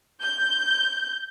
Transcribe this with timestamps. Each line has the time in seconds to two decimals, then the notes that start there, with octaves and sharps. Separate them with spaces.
0.21 G6